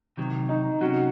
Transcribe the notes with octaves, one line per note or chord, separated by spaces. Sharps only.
C3 D#3 F#3
D#4
C3 F#3 C#4 F#4